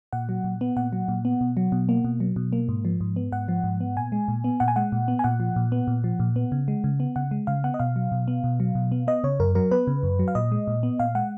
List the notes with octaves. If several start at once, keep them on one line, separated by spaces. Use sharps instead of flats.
A#2 F#5
F#3
A#2
B3
A#2 F#5
F#3
A#2
B3
B2
F#3
B2
A#3
B2
F#3
B2
A#3
G#2
F3
G#2
B3
G#2 F#5
F3
G#2
B3
A#2 G#5
G#3
A#2
B3
A#2 F#5
G#5
G#3 F#5
A#2
B3
G#5
A#2 F#5
F3
A#2
B3
A#2
F3
A#2
B3
C#3
G#3
C#3
B3
C#3 F#5
G#3
C#3 F5
B3 F#5
D#5
B2 F5
F#3
B2
B3
B2
F#3
B2
B3
B3 D#5
C#3 C#5
F#2 A#4
F#3 A#4
B3 B4
C#3
F#2
F#3
F5
A#2 D#5
G#3
A#2
B3
A#2 F5
G#3 F#5